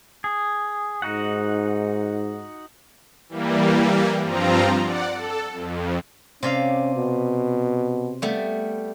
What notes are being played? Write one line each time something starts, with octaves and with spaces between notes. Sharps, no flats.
G#4
G#2 D#4 F#4 F#5
E3 G3 A#3
G2 F3 C4 F4 A#5
D5 F#5
A4
F2
C3 C#4 D5 F5
B2
G3 A3 B3